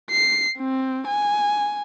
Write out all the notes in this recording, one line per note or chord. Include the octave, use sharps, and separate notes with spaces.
C7
C4
G#5